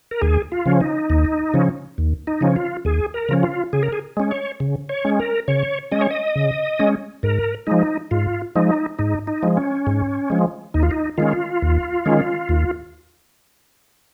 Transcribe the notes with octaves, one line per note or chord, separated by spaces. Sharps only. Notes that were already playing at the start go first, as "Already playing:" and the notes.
A#4
D#2 G#4
F4
C#3 F3 C#4
D#4
D#2
C#3 F3 C#4
D#2
D#4
C#3 F3 C#4
F4
D#2 G#4
A#4
C#3 F3 C#4
F4
C#3 G#4
A#4
G#4
G#3 C#4
C#5
C#3
C#5
G#3 C#4
A#4
C#3 C#5
G#3 C#4 D#5
C#5
D#5
C#3
G#3 C#4
G#2 A#4
F3 G#3 D#4
G#2 F4
F3 G#3 D#4
G#2 D#4
D#4
F3 G#3
C#4
G#2
F3 G#3
D#2 D#4
F4
D#4
D#3 G#3 C#4 F4
D#2
D#3 G#3 C#4
D#2